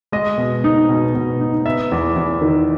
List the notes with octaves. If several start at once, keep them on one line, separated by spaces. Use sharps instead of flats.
G#3 D#5
B2
D#4
B2
B2
D#4
B3 E5
E2
E2
D#3